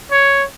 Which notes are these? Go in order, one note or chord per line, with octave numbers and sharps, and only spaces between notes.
C#5